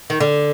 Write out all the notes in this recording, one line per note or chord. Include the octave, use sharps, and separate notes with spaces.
D#3
D3